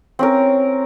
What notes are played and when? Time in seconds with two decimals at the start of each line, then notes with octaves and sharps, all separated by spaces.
0.19 C4 C#4 A#4